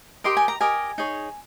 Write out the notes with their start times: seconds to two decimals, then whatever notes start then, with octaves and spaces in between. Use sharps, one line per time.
0.24 G4 A#4 D#5 C6
0.37 G#5
0.48 A#5
0.60 G4 A#4 D#5 G#5
0.98 D#4 G#4 C#5